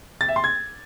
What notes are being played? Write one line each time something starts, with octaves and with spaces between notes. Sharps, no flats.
A6
E5
C6
G#6